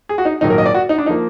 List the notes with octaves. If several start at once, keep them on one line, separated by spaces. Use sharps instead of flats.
G#4
F#4
D#4
A#1 G#2 D#3 F#3 A#3 D#4
A#4
D#5
D5
F#4
D#4
D4
D#4
F3 A#3